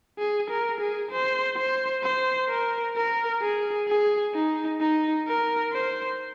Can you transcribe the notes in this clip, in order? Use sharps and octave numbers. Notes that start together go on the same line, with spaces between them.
G#4
A#4
G#4
C5
C5
C5
A#4
A#4
G#4
G#4
D#4
D#4
A#4
C5